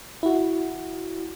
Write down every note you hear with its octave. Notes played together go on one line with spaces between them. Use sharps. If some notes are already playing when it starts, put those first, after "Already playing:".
E4 F#4